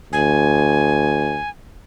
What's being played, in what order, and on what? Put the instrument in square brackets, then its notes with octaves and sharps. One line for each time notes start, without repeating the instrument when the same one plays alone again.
[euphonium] D2 [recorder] G#5